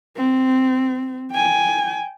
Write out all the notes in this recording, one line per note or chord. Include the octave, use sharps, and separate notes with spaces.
C4
G5 G#5